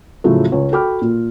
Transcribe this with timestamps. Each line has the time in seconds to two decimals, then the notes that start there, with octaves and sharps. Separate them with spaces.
0.24 A2 C#3 F3 F#3 A3
0.52 C#2 C#5
0.72 F#4 A4 G5 B5 D6 F6
1.02 A#2